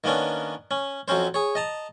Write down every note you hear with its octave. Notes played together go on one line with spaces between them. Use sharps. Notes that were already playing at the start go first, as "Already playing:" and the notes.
D#3 A#3 B3 C#4 D4
C#4
F2 F#3 C4 C#4 C5
G#4 C#5
D#5 A5 A#5